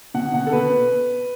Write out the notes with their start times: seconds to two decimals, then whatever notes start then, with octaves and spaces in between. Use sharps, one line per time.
0.14 B2 F#5
0.33 B2 F#5
0.47 A4
0.52 B2 B4